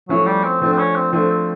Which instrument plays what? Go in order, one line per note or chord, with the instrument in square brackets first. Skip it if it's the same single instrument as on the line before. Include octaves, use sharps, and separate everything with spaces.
[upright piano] F3 A3 C#4 E4 [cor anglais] F#3
[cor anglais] G3
C4
[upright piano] F3 A3 D4 [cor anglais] C4
[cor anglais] C4
C#4
C4
[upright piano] F3 A3 D4 [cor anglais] C4
[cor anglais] C4